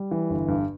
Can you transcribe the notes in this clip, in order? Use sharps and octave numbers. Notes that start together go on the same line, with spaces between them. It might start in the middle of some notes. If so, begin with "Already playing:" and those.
Already playing: G3
E3
G1
G2